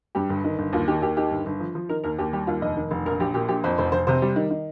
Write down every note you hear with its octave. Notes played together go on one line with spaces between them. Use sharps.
G2 G4
G1
D#3
G1
D#2 F4
D#3 G4
D#2 G4
D#3 G4
G1
G1
F3
F3
D#3 A#4
D#2 A#4
D#2 G4
G3 G4
D#2 F4
F1 D#5
D#3
F1
A#1 A#4
A#1 G4
A#2 G4
A#1 G4
F2 C5
F1 C5
F1 C5
C3 C5
G3
D#3
D#3